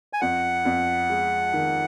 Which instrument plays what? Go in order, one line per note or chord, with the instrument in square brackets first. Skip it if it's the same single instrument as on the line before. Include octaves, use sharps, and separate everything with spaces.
[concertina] G#5
[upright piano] F2 [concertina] F#5
[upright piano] F2
G#3
D#3